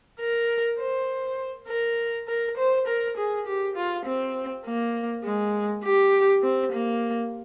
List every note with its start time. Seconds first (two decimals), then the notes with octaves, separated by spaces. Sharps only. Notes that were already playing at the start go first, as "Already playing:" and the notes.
0.20 A#4
0.79 C5
1.68 A#4
2.28 A#4
2.58 C5
2.87 A#4
3.17 G#4
3.47 G4
3.76 F4
4.06 C4
4.65 A#3
5.24 G#3
5.84 G4
6.43 C4
6.72 A#3